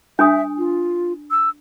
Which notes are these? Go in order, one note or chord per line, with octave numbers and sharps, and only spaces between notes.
D4 E5 G#5 D#6
F4
E6